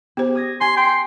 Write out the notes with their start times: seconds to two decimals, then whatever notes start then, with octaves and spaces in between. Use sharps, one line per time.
0.17 B3 G4 C5
0.35 D#6 G#6 A#6
0.61 G#5 C6 C#6 G#6
0.77 G5 C6